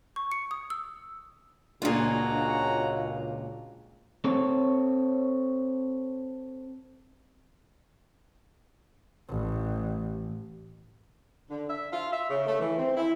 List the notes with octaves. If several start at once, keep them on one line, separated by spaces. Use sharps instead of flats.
C#6
C#7
D#6
E6
C#2 A#2 A#3 D4 F4 F#4 G#4 A#5
C4 A4 C#5
A1
D3
E5
F4
E5
C#3
A3
E3
C4
E4